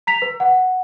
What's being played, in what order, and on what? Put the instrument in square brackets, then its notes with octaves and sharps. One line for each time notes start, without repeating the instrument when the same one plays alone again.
[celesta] A#5 B6 F7
B4
F#5